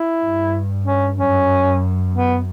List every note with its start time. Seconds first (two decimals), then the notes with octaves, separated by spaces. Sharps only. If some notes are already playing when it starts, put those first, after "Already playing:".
Already playing: E4
0.22 G2
0.85 C#4
1.17 F#2 C#4
2.15 B3